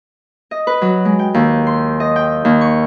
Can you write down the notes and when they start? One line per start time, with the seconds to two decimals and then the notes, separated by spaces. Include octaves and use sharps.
0.51 D#5
0.67 B4
0.82 F#3
1.05 G#3
1.19 G5
1.34 D#2
1.67 C6
2.00 D#5
2.16 G5
2.45 D#2
2.61 C#6